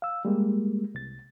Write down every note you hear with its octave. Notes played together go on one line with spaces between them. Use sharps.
F5 E6
G3 G#3 A#3
C2 A6